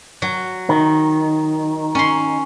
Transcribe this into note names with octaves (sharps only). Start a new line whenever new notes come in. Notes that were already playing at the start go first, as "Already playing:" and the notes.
F#3
D#3
C#4 C6